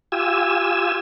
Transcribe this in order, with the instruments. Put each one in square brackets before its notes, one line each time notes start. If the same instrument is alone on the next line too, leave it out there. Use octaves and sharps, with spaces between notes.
[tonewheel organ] F4 G4 G#5 E6